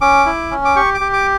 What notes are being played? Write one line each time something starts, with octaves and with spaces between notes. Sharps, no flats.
C#4 D6
E4
C#4
D6
G4 C#6
D6
G4
D6